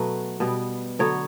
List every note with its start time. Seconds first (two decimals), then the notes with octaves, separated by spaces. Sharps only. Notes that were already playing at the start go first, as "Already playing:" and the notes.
Already playing: B2 F#3 A3 B4
0.40 B2 G3 B3
0.99 D3 F#3 B3 C#5